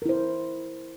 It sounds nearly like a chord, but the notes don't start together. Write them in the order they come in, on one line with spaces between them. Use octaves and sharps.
A#4 E4 C5